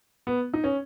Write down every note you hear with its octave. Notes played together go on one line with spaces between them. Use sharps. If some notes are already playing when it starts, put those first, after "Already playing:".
B3
D#4
C#4